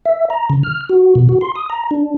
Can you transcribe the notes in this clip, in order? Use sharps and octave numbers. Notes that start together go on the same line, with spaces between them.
E5
A#5
C#3
F6
F#4
B2
F#4
C6
D#6
A#5
D4